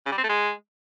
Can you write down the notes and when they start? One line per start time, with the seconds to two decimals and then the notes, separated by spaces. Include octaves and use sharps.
0.06 C#3
0.12 G3
0.18 C4
0.24 A3
0.29 G#3